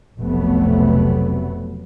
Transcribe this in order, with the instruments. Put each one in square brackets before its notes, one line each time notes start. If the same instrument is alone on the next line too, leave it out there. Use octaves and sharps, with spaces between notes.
[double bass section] F1 B1 C3 F#3 A3 B3